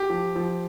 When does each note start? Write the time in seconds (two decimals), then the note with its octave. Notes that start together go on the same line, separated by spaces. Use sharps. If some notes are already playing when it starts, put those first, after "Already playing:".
Already playing: G4
0.10 F3
0.35 F3